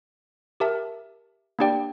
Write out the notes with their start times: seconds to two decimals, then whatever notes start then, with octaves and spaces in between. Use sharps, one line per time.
0.60 G4 A#4 E5 A5
1.59 A#3 D4 G4 D5 G5